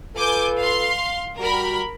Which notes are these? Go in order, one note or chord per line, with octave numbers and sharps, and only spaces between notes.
F4 A4 B4 G#5 D6 G6
F5 C6
G3 F#4 A#4 B5